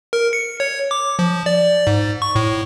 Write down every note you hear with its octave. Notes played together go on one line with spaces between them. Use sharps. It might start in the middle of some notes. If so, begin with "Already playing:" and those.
A#4
C#7
C#5
D6
F3
D5
G#2
C#6
A2